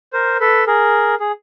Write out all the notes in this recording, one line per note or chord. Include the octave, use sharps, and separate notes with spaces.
A#4 C5
A4 B4
G#4 A#4
G#4